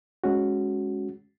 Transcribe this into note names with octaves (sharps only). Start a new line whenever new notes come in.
G#3 C#4 F#4